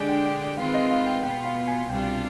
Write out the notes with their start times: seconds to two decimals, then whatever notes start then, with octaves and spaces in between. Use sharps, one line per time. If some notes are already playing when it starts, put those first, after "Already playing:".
Already playing: D3 G#3 D4 G4 D5 G#5
0.09 G5
0.25 G5
0.41 G5
0.57 D#3 G#3 C4 F4 B4 F5
0.74 D#5
0.91 F5
1.06 G5
1.23 B2 B3 F4 G5
1.45 F5
1.67 G#5
1.89 C2 B2 G3 D4 F4 G5